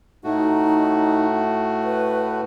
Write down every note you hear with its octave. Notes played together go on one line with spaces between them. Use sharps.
A2 A3 D#4 F#4
B4